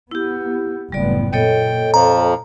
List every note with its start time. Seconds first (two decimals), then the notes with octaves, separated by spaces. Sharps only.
0.11 B3 E4 G4
0.92 F#1 A2 G3 B3 D5
1.33 A#2 A4 C#5 D#5 G5
1.94 F2 F3 A#5